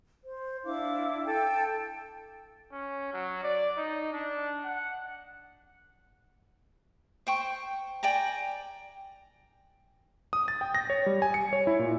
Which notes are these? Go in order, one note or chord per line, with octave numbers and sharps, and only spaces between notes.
C5
D4 E4 F5 D6
A4 G5
C#4
F#3
D5
D#4
D4
F#5
C5 G5 C#6
D5 G5 G#5 A#5
D#6
A6
G5
A#6
C#5
G3
G#5
C#7
C#5
E4
A#2